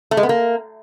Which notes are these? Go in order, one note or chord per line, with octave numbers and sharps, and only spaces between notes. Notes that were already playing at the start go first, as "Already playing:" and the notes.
A3
G#3
B3
A#3